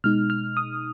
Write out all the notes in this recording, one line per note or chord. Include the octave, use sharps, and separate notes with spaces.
B2 G#3 D#4 F6
F6
D#6